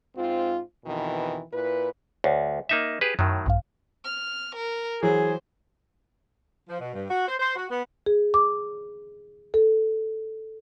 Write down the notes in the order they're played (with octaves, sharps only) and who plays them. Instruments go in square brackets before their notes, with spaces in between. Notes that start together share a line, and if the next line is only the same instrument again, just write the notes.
[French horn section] G#2 C4 F4
F2 B2 D#3 E3
A#2 E4 B4
[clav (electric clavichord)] D2 [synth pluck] C#5 F#5
[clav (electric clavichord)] A#3 D#4 E5
G4 G#4 B4
[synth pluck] F#2 [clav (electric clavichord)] A2 D#3 F#3
[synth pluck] A#1 G2 F5
[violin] F6
A#4
[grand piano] E3 F#3 [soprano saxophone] G#4 [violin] C5
[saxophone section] F3
B2
G2
F#4
C5
C5
F#4
B3
[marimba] G#4
D6
A4